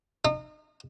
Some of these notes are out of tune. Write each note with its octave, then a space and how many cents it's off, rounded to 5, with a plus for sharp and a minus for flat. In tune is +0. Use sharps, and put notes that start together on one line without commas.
D#4 -35